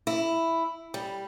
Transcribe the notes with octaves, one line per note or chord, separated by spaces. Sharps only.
E4
G3